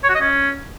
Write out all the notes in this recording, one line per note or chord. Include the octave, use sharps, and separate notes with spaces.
C#5
F#4
D#5
C#4